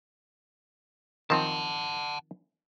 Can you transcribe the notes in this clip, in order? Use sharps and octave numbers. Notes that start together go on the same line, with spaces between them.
D#3 F3 C4 F#5 A5